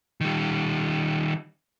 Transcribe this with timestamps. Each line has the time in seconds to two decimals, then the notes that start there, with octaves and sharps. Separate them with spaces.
0.21 D#3 G3